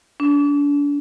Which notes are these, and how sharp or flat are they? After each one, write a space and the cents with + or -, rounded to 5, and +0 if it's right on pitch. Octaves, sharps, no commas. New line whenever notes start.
D4 -35